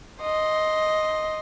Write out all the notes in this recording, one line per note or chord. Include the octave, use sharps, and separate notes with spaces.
D#5 C6